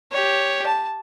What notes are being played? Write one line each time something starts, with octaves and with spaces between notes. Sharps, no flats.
G4 C#5
A5